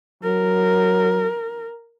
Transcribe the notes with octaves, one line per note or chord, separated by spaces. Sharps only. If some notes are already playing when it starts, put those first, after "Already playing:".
F#3 A#4